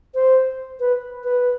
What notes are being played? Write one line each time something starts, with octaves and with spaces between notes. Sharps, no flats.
C5
B4
B4